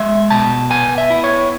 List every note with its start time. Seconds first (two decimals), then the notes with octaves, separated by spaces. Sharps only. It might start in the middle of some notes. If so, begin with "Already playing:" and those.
Already playing: G#3 E5
0.30 B2 A5
0.70 B3 G#5
0.98 E5
1.10 E4
1.24 C#5